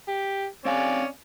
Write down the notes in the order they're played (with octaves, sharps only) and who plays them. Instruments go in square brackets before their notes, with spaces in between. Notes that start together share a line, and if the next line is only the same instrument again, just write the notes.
[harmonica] G4
[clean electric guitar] C4 F5 G#5 [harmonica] C#4 D5